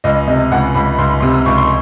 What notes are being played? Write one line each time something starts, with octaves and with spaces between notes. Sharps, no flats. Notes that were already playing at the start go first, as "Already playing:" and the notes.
C#2 D#5
C3 D#5
C#2 F#5
C#2 B5
C#2 C6
B5
C3 C6
C#2 C#6
C6